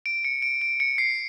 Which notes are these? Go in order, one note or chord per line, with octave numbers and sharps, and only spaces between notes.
D7
C#7
D7
D7
C#7
C7